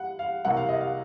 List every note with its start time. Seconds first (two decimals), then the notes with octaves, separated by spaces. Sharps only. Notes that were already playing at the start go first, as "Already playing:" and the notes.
Already playing: F#5
0.19 F5
0.45 C2 C3 F#3 A#3 F#5
0.57 F5
0.69 D#5
0.81 F5